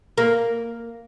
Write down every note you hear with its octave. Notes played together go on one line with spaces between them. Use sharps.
A#3